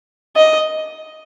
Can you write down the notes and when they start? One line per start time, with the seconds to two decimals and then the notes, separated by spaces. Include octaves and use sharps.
0.36 D#5